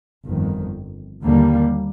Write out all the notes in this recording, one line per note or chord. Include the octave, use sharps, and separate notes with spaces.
G1 F2 D#3
D#2 D3 G3 A#3